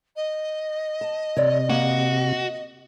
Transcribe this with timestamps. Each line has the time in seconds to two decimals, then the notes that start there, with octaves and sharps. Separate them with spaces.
0.16 D#5
1.01 A5
1.37 C3 C#5 D5
1.70 A#3 F#4